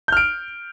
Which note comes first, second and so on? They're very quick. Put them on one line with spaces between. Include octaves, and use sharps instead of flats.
G6 F6 D7